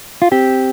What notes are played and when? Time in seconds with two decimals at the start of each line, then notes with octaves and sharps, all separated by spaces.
0.22 F4
0.32 C4 G4